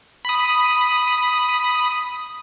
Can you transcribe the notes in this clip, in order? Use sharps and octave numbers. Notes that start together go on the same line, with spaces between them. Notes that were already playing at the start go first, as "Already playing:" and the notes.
B5 D#6